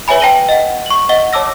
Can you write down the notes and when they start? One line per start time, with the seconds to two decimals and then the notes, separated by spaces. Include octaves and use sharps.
0.08 B4 C#5 E5 G#5 B5
0.20 G5 A5 A#6 D#7 F#7 G7
0.49 D#5 F#5
0.86 C#6 F#7
1.09 D#5 F#5 G7
1.33 C#5 A5 D6 E6 A#6